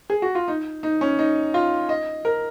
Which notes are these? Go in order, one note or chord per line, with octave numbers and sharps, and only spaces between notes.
G#4
F#4
F4
D#4
D#4
C#4
D#4
F4
D#5
A#4